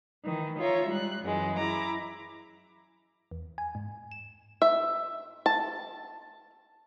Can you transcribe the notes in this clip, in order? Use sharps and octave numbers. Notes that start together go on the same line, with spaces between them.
D#3 E3
F4 C#5 E5 A#5
G3 G#3 F#6
F#2 E3 G#3
E4 A#5 D6
E2
G#5
G#2
E7
E5
A5